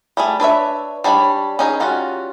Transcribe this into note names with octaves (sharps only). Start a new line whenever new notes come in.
G3 A3 G#4
D4 B4 C#5 E5
G3 D4 C#5 G5 B5
C#4 D#4 G#4
G3 C#4 F4 F#4